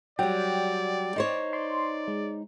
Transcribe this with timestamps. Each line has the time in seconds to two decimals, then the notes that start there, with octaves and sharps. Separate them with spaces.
0.19 F#3 G3 D5 G5
1.16 D#4 C5 C#5
1.53 D5 C6
2.08 G#3